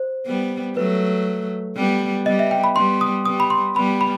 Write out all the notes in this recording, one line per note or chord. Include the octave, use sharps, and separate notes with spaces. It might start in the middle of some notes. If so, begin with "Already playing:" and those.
Already playing: C5
G3 B3
F#3 A3 B4
G3 B3
G3 B3 D#5
E5
G5
B5
G3 B3 C6
D#6
G3 B3 D#6
B5
C6
G3 B3 B5
B5